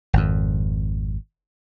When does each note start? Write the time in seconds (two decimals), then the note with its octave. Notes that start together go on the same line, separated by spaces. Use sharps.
0.13 G#1 F2